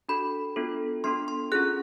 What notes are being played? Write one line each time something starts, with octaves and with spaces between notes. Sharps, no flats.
D4 F#4 A4 B5
B3 D4 F4 A4
B3 D4 F4 A4 C6
C6
C#4 F4 G#4 F#6